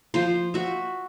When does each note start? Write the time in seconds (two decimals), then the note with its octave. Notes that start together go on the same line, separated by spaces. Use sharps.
0.14 F3 C5
0.54 F#4 E5